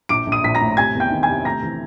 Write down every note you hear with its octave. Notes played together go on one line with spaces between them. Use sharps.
A#1 D6 D7
A#1
D#6 D#7
A#1 B6
A#5 A#6
A2
C3 G#5 G#6
E2
G5 G6
D#3
G#5 G#6
C3
A3 A#5 A#6
E3